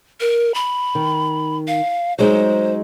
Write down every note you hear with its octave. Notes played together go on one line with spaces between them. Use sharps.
A#4
B5
D#3
F5
F#3 G#3 D#4 C5